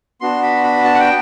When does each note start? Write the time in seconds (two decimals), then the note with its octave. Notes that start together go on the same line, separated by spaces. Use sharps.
0.21 B3 D4 F#4 C6
0.43 B5
0.64 B5
0.84 A5
0.94 F#5
1.00 G5